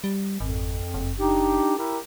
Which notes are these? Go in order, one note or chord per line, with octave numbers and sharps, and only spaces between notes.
G3
G#1 F2
F#1
D4 D#4 G4
E4 G4 A#4